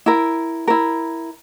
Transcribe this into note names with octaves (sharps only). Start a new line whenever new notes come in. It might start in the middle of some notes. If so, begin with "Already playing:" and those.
E4 A#4
E4 A#4